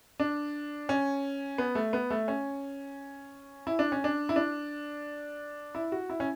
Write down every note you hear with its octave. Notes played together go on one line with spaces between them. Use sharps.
D4
C#4
B3
A3
B3
A3
C#4
E4
D4
C#4
D4
E4
D4
E4
F#4
E4
C#4